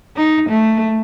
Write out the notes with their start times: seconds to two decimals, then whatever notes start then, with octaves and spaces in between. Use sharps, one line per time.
0.17 D#4
0.50 A3